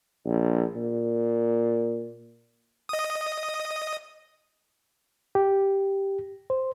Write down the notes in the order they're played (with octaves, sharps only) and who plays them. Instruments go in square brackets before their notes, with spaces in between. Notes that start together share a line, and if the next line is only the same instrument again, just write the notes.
[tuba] A#1
A#2
[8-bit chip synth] D#5 D#6
[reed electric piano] G4
C5